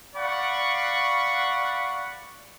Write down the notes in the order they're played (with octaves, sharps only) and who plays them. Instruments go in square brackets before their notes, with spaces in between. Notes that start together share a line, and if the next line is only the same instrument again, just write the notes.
[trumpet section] D5 F5 F#5 B5 C#6